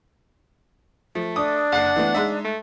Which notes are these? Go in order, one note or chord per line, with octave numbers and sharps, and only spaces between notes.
F3 A3
D4 D6 D#6
F#1 F#5 C7
E3 A3 B3
G#3 D#4 E5
A3